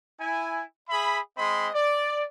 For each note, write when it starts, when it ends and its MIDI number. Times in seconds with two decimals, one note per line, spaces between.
0.20 0.63 64
0.20 0.63 80
0.89 1.19 68
0.89 1.19 76
0.89 1.19 83
1.37 1.69 56
1.37 1.69 60
1.37 1.69 75
1.37 1.69 83
1.37 1.69 84
1.73 2.25 74